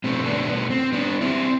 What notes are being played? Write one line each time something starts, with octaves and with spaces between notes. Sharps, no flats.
B2 A3 C4
B3 D4
C4
B3
C4
B3 D4
C4 E4